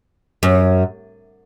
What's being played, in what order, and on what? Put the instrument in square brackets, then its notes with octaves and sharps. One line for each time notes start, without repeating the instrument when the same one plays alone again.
[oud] F#2